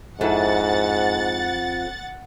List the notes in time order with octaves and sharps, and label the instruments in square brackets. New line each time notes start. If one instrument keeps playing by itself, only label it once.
[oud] F2 E4 A4 [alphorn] G#2 [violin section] F#5 A6